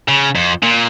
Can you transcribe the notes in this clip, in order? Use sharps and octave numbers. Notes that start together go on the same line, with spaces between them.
C#3
F2
A#2